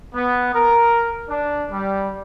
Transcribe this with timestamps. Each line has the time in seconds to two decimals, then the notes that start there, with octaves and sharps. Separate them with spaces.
0.13 B3
0.54 A#4
1.29 D4
1.70 G3